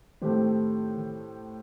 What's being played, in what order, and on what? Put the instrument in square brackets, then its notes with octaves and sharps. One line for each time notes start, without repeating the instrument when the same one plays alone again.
[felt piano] A2 A3 C4 G4 C5 [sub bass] D#3